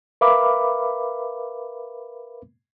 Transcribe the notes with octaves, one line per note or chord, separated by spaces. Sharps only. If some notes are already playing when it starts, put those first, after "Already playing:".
A#4 B4 E5 F5 B5 D6